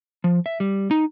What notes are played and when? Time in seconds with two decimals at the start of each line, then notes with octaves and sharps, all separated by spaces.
0.24 F3
0.46 E5
0.60 G3
0.91 D#4